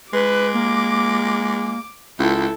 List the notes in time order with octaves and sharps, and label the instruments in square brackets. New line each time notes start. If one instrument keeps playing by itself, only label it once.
[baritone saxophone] G#3 [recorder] B4 [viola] D6
[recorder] A#3
[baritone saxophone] C#2 [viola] E4 A4